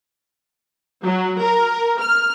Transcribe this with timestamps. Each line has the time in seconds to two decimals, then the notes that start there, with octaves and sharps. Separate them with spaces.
1.04 F#3
1.40 A#4
2.01 F6